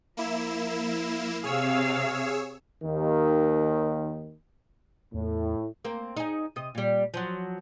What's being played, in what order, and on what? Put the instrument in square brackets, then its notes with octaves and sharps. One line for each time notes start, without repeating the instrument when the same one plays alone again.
[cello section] F3 [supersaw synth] A#3 E4 E7
[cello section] C3 F5 [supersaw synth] G#4 C#5 E6
[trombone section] D#2 D#3
[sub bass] E2 [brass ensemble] A2
[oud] A#3 C4
D#4 G#4
C3 D#5
A#2 G3
F3 F#3